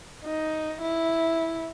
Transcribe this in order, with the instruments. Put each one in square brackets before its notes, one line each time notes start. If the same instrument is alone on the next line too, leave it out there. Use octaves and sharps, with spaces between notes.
[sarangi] D#4
E4